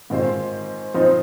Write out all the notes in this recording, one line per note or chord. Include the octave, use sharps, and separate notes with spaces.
G#2 D#3 C4 F4 C5
F3 C4 D#4